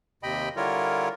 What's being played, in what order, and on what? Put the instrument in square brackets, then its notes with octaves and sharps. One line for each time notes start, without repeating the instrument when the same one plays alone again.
[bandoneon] D#2 C3 D#5 G5 B5
D3 G3 E4 F4 A#4 C#5